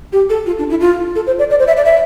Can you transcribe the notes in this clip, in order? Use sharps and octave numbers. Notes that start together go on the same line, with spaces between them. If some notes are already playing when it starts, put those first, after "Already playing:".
G4
A4
F4
D4
E4
F4
A4
C5
D5
D5
C5
E5
D5
E5